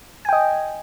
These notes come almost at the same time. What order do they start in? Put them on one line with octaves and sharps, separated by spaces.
G#5 G5 D#5